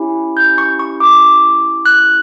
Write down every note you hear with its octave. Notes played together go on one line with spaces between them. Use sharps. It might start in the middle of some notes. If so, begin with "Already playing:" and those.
Already playing: C#4 E4 G4
G6
C#6
C#6
D6
F#6